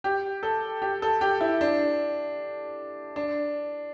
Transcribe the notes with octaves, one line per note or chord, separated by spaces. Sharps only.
G4
A4
G4
A4
G4
E4
D4
D4